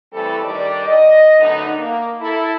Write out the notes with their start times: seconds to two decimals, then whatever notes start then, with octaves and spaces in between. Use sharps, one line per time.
0.13 E3 G3 A3 C4 A4
0.44 G2 D#3 G3 G4 D5
0.85 D#5
1.39 F#2 D3 A3 B3 D#4
1.79 A#3
2.20 E4 A4